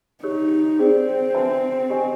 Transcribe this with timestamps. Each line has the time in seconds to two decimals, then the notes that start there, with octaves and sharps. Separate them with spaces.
0.23 D#4 G4 A#4 C#5
0.79 C4 G#4 B4 D5
1.34 D4 F#4 B4 E5 A5
1.90 G4 A#4 D#5 G#5